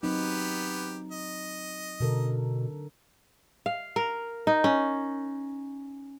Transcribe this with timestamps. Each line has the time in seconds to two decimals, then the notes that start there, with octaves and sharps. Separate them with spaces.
0.03 F#3 B3 C4 D#4 G4 B4
1.12 D#5
2.00 B2 D3 A4 A#4
3.66 F5
3.96 A#4
4.47 D#4
4.64 C#4